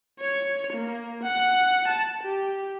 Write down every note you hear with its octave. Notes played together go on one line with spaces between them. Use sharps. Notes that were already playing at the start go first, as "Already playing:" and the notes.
C#5
A#3
F#5
A5
G4